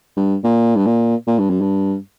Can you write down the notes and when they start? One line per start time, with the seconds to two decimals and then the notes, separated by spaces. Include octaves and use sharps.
0.17 G2
0.44 A#2
0.76 G2
0.86 A#2
1.27 A#2
1.39 G2
1.50 F#2
1.61 G2